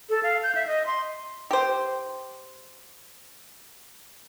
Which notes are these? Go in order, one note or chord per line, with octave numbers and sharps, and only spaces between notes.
A4
F5
G6
E5
D#5
C6
G4 C5